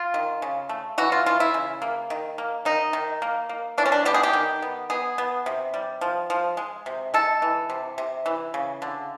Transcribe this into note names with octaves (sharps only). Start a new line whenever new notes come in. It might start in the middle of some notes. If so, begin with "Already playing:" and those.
Already playing: F4
D#3
C#3
A3
E3 F#4
F4
E3 F4
E4
C#3
A#3
D#3
A#3
D#3 D#4
D#3
A#3
A#3
E3 D4
C#4
D4
B3 G4
G#4
G4
D#3
B3
B3 G#4
B3
C3
G3
F3
F3
G#3
C3
G#3 A4
E3
C3
C3
E3
C#3
D3